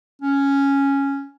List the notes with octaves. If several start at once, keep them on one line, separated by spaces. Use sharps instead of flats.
C#4